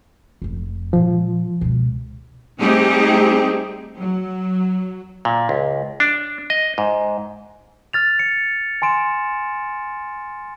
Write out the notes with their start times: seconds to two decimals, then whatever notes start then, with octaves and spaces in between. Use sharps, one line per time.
0.42 F1 F2
0.93 A#2 F3 G#3
1.61 C#2 B2
2.59 G3 A3 C4 D#4 G4 G#4
3.96 F#3
5.25 A#2
5.49 C#2
6.00 D4
6.50 D#5
6.78 G#2
7.93 F6 A6 F7
8.19 C#7
8.82 G#5 C6 D7 E7